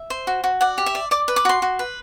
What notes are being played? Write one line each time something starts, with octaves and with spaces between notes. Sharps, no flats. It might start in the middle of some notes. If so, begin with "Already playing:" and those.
Already playing: E5
C5
F#4
F#4
D5 F#5
G4
E5
D5
D5 D6
B4
D6
F#4 C6
F#4
B4